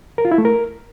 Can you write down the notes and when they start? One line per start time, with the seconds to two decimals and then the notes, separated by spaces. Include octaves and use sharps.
0.18 A#4
0.25 F4
0.32 E4
0.38 A3
0.45 A#4